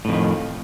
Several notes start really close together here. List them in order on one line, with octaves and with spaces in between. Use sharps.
A2 F2 D#3